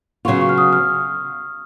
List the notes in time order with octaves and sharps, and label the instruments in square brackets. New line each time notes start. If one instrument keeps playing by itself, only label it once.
[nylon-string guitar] C#3 F#3 B3 F4 [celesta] C#6
[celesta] C#6
F6
D#6
F6